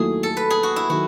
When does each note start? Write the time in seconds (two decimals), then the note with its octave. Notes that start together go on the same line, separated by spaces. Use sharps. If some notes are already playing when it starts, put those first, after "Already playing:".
Already playing: D#2 D#3 F#3 A3 E4 G#4
0.23 A4
0.37 B4
0.50 G#4
0.63 F#4
0.76 E4
0.89 D#3 F#3 F#4